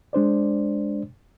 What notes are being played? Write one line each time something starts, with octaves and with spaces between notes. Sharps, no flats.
G#3 D4 C5 D5